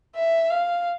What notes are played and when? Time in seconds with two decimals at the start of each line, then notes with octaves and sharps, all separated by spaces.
0.16 E5
0.50 F5